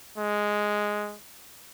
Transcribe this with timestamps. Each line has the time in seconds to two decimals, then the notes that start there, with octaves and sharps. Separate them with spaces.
0.18 G#3